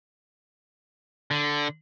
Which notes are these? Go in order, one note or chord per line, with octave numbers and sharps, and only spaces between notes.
D3